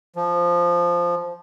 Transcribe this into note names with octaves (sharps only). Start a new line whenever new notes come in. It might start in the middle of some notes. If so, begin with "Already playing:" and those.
F3